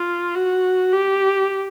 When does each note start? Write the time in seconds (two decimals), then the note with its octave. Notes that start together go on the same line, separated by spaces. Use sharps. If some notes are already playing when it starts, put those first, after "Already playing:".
Already playing: F4
0.35 F#4
0.93 G4